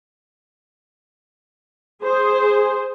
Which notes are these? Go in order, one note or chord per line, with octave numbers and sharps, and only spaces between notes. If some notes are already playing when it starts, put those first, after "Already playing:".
G#4 C5